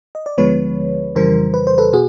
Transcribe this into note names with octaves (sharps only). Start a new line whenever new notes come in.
D#5
D5
D2 D3 F3 G#3 B3 B4 C#5
F2 C#3 E3 G3 A#4 C5
B4
C5
A4 B4
B2 F#4 G#4